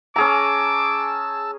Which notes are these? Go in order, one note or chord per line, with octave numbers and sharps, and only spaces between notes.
C#4 G#4 A5 A#5 D6 E6